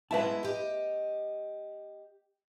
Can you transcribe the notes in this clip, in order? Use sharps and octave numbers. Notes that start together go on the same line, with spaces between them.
G#3 B3 E4 B4 E5 A5
G4 D#5